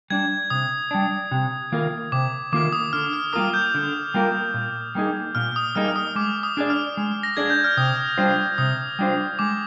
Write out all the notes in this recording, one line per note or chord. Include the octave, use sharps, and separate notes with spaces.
G3 D4 G#6
C3 D#6
G3 D4
C3
D#3 A#3 F4 A#4
C3 D6
D#3 A#3 F4 A#4 D6
D#6
D3 F6
F6
G3 A#3 F4 A#4 D#6
G6
D3
G3 A#3 F4 A#4
A#2
G3 A#3 D#4 G#4
A#2 F6
D#6
G3 A#3 D#4 G#4 F6
F6
D#6
G#3 D6
D#6
D4 G#4 D5
F6
G#3
A#6
D4 G#4 D5 G#6
G6
F6
C3 D#6
G3 D4 F4 C5
C3 D#6
G3 D4 F4 C5
G#3 D6